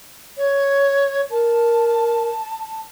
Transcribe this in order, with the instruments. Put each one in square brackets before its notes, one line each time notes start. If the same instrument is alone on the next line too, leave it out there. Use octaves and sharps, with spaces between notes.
[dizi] C#5
[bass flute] A#4 [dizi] A5